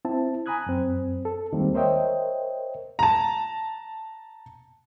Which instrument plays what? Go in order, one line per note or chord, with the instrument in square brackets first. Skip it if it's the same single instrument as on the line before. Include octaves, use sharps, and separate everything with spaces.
[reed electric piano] C4 E4 A5
G#5 A#5 B5 D#6 F#6 G#6
F#2 C4
A4
D#2 D#3 G3 G#3 A#3 C4
A#4 C5 C#5 D#5 E5 G5
[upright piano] A5 A#5